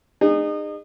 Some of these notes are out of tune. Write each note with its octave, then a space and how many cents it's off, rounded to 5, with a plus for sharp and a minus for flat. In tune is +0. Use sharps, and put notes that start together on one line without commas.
D#4 -35 G#4 -30